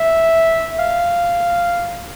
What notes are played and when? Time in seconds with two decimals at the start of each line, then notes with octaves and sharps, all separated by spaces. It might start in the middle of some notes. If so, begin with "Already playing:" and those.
Already playing: E5
0.79 F5